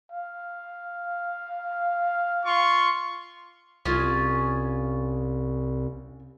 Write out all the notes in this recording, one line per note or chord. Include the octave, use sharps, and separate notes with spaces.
F5
F4 C6 C#6
C2 C#4 F4 G#4